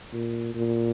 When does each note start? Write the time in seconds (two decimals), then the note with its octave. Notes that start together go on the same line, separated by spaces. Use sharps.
0.12 A#2
0.54 A#2